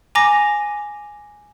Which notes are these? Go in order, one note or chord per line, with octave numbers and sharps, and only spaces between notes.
G#5 A#5 D6 A#6